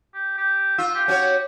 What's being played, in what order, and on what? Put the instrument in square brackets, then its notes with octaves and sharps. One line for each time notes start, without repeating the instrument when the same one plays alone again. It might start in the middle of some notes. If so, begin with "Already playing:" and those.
[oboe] G4
G4
[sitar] F4 [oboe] E6
[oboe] G4
[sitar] C#4 F#4 C#5